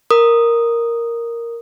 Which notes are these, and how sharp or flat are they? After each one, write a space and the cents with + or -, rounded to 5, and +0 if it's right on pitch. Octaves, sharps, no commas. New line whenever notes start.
A#4 +0 D#6 -10